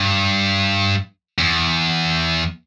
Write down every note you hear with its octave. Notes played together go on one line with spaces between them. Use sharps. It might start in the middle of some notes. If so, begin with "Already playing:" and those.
Already playing: G2
E2